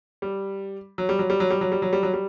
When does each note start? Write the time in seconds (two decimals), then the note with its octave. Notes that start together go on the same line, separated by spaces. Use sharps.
0.22 G3
0.98 F#3
1.09 G3
1.19 F#3
1.30 G3
1.40 F#3
1.50 G3
1.61 F#3
1.72 G3
1.82 F#3
1.93 G3
2.03 F#3
2.13 G3